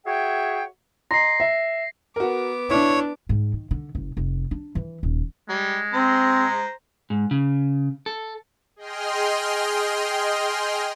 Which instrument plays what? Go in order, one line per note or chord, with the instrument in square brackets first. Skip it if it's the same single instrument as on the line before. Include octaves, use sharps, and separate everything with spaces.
[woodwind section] F#4 G#4 C#5 E5 G5
[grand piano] D#5 A#5 C6 [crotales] A#6 C7
[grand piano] E5
[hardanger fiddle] B3 D6 [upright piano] F#4 A#4
[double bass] D4 [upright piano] E4 [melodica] C#5
[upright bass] G#2
D#3
D3
F#1
F1
D4
E3
D#1
[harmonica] G3 [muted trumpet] G#3
[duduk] C4 [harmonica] C5 A#5 C6
[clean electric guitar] G#2
C#3
A4
[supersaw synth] G#4 D#5 G5 C6 F6